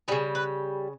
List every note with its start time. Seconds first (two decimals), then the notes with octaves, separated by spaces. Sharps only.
0.08 C#3 G3 G#4
0.35 B4